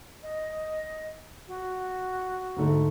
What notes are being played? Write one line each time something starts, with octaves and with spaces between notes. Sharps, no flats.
D#5
F#4
D2 G#2 A3